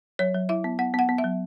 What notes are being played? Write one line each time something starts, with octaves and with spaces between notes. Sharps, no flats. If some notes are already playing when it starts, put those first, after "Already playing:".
F#3 C#5
F#3
E4 E5
B3
B3 F#5
B3 F#5
B3
E5
F#3